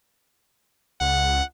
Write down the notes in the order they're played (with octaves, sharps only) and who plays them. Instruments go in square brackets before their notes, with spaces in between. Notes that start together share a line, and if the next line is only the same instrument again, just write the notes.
[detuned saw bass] C#2 [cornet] F#5